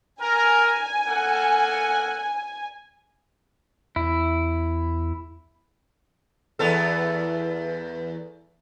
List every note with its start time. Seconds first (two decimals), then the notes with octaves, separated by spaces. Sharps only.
0.21 A#4 G#5
1.07 A#3 A4 F#5
3.96 E2 E4
6.59 E2 B3 A4